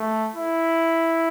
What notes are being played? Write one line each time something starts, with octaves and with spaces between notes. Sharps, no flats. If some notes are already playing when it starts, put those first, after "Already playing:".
Already playing: A3
E4